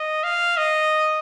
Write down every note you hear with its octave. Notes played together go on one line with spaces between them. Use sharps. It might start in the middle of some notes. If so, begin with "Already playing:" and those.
Already playing: D#5
F5
D#5